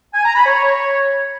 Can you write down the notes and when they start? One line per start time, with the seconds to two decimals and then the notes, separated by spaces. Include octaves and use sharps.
0.14 G#5
0.24 A#5
0.35 B5
0.46 C#5